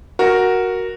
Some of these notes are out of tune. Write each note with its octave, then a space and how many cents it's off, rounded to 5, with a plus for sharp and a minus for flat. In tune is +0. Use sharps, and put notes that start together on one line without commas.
F#4 +0 A#4 +0